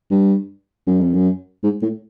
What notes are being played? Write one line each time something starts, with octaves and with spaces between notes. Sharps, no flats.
G2
F#2
F2
F#2
G#2
A2